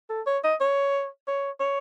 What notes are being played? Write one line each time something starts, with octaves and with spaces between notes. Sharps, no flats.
A4
C#5
D#5
C#5
C#5
C#5